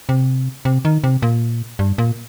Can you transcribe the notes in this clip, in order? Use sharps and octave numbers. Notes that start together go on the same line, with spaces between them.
C3
C3
D#3
C3
A#2
G2
A#2